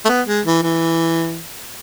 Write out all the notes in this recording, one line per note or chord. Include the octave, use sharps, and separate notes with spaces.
A3
B3
G#3
E3
E3